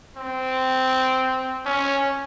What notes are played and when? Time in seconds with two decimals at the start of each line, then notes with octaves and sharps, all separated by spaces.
0.17 C4
1.66 C#4